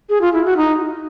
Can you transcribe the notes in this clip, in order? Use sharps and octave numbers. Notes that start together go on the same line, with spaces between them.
G#4
F4
E4
F#4
D#4